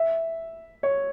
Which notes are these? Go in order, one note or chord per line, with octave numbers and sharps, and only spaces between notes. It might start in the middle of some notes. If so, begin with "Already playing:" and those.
Already playing: E5
C#5